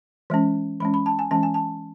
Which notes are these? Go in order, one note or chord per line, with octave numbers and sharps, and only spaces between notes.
E3 G#3 C#4
E3 G#3 C#4 B5
B5
A5
G#5
E3 G#3 C#4 A5
G#5
A5